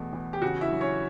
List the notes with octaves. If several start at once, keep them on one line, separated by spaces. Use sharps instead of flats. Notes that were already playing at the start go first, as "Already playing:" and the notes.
Already playing: E2 B2 A3
E2
G4
C#3 F#4
E4 E5
F#3
C#4 C#5